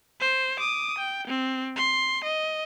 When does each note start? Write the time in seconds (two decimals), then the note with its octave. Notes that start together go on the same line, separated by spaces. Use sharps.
0.20 C5
0.60 D6 D#6
0.98 G5
1.28 C4
1.76 C6
2.24 D#5